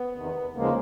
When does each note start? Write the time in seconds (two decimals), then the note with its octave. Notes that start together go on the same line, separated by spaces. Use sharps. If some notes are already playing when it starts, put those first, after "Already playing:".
Already playing: B3
0.16 E2 C3 D#3
0.55 D#2 C#3 F3 G#3 A#3